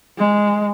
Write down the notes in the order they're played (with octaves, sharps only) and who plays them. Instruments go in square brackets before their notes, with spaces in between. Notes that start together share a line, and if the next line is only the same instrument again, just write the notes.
[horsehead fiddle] G#3